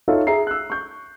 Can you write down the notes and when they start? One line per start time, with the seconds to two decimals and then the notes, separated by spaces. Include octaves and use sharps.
0.08 D#4 F4 A4 C#5 E5 F5
0.27 G#4 E5 A#5 C7
0.47 E6 F#6
0.70 C#6 G6